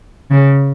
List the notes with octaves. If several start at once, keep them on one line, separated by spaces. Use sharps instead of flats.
C#3